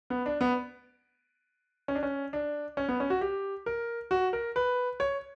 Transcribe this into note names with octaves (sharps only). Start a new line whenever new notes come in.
B3
D4
B3
C#4
D4
C#4
D4
C#4
B3
C#4
F#4
G4
A#4
F#4
A#4
B4
C#5